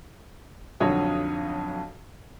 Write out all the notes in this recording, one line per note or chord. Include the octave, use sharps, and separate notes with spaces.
B1 F2 D3 F#4 C#5 D#6